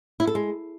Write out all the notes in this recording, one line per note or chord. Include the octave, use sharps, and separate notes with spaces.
E4
A4
G#3